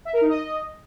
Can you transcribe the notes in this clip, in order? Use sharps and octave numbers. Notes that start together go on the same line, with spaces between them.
E5
A#4
D#4
D#5